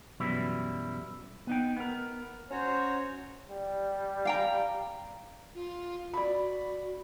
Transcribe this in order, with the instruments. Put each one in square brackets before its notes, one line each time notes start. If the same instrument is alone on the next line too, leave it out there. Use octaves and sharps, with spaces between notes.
[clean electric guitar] F#2 B2 E3 F#3 G3 E4
B3 D#4 G5
B3 A#4
[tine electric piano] C#4 [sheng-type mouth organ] F#4 C#5 A#5 [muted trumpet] C5
[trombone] G3
[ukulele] F5 G5 A#5
[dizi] F4
[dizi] F#4 [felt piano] D5 B5